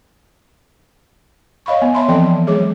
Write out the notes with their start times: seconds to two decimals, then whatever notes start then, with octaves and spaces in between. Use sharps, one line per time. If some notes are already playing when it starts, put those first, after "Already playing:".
1.66 C#5 D#5 F5 B5 C#6
1.82 B3
1.95 C#5 E5 A5 B5 C6
2.08 E3 F3 C4 A4 D#5 G5
2.46 F#3 G#3 G#4 C#5 D6